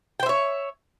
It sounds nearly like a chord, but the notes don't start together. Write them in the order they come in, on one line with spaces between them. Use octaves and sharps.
G5 C5 E5 C#5